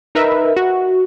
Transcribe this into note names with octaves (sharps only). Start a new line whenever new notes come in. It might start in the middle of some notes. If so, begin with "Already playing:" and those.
D#4 A#4 B4 E5
F#4